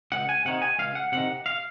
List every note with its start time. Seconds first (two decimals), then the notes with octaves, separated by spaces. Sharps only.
0.12 C#2 F#5
0.29 G#5
0.45 C3 D#3 F#5
0.62 G#5
0.79 C#2 F5
0.95 F#5
1.12 C3 D#3 F#5
1.46 F5